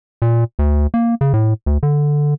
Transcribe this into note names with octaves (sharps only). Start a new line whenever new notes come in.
A#2
D2
A#3
C#3
A2
D2
D3